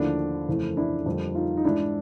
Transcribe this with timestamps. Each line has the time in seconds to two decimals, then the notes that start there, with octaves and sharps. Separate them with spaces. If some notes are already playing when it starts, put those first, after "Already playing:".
Already playing: D#2 D3 F3 A3 D4 E4
0.48 F2 C#3 E3 A3
0.77 D4 E4
1.06 F2 D3 G3 A#3
1.35 D#4 F4
1.57 D#4
1.64 G#2 E3 G#3 D4 E4